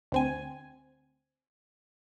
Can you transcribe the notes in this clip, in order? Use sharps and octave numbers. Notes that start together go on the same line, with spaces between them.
D2 C4 G#5